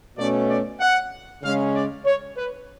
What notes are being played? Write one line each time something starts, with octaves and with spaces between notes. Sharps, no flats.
B2 A3 C#4 D5
D5
F#5
C#3 G#3 C#4 F5
D5
C#5
B4